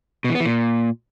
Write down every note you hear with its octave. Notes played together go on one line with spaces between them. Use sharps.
B2
E3
B3
E3
A#2